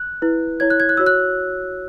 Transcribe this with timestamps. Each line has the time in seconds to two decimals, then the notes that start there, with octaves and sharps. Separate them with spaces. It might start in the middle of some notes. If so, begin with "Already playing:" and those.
Already playing: F#6
0.22 E4 B4
0.60 E4 C#5 G#6
0.70 F#6
0.80 G#6
0.89 F#6
0.97 F#4 C#5 E6
1.06 F#6